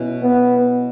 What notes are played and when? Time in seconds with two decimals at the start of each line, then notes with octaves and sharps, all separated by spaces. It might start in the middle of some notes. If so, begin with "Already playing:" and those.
Already playing: B2 F#3 C#4 E4
0.22 B3